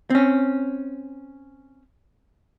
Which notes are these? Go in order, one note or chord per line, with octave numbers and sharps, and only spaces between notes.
C4 C#4